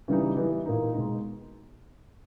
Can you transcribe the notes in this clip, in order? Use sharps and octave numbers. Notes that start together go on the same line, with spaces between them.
C#3 E3 G3 B3 D#4
E3 G3 B3 E4
A#2 A#3 D#4
B2 G#3 B3 D#4